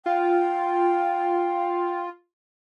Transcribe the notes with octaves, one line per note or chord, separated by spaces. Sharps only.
F4 G5